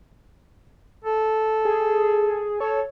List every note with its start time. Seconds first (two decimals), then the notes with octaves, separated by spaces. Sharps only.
1.04 A4
1.65 G#4
2.60 A4 C#5